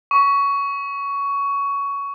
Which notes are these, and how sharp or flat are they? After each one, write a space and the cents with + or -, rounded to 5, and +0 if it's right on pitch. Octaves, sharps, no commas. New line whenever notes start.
C#6 +15